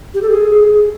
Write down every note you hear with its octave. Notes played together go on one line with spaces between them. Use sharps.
G4
A4
G#4